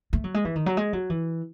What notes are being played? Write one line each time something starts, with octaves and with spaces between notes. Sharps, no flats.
A3
F#3
G#3
E3
D#3
F#3
G#3
F#3
E3